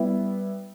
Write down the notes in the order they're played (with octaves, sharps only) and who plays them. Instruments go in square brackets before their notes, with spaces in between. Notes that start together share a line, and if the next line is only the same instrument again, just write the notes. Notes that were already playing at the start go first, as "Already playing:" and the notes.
Already playing: [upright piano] G3 B3 E4